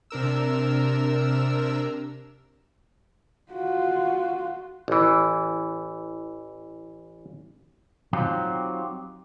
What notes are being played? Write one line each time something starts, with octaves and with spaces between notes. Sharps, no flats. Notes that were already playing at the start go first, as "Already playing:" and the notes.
C3 D4 A#4 E6
F4 F#4
A1 E3
F#3 C4 D#4 F4 G4